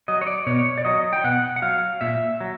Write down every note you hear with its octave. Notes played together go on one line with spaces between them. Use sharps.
F#3 D#5
C#5
D5
B2 C#5
D5
F#3 D#5
G5
B2 F#5
F#5
F#3 F5
A#2 E5
F#3